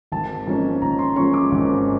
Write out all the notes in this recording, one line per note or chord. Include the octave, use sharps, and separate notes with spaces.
G#1 A5
G#2 F3 A#3 C#4
G#1 A#5
C6
G#2 F3 A#3 C#4 C#6
D6
G#1